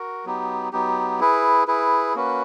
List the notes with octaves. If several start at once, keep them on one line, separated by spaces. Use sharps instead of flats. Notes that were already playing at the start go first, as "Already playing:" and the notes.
Already playing: F#4 A#4
F#3 B3 D#4 G4
F#3 B3 D#4 G4
E4 G#4 B4
E4 G#4 B4
A#3 C#4 F#4 B4